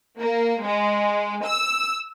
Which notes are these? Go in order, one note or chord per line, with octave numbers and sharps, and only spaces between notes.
A#3
G#3
E6